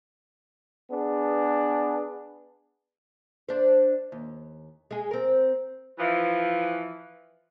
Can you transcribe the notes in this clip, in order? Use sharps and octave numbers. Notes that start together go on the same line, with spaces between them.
B3 D4 G#4
D4 C5
D#2
G#3 G#4
C4 A#4
E3 F3